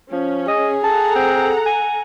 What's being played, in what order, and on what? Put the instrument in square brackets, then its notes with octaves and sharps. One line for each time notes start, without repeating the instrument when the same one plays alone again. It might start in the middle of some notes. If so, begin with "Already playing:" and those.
[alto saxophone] F3 [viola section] C#4
[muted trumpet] G#4 [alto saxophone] D#5
[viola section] A4 F#5 A#5 [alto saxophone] A5
[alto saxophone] C4
G#5